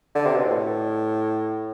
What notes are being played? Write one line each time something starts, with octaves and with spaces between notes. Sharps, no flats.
D3
C3
B2
A2